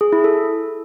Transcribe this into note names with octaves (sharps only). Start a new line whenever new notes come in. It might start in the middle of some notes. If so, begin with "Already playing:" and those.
G#4
E4
A4